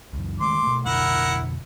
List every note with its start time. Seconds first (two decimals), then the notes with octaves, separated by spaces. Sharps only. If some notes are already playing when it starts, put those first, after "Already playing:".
0.13 C#2 F#2
0.40 D#3 G#3 A3 C6 D6
0.63 B2 A3
0.86 F2 B2 D3 E4 A#4 F#5